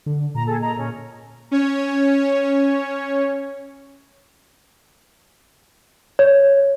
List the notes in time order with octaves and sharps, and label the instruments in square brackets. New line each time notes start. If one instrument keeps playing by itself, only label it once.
[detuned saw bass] D3
[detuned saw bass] A#2 [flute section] A#5
[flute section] G#4 A4
D#5 A#5
[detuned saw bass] A#2 [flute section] C#4
[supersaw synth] C#4 C#5
[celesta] C#5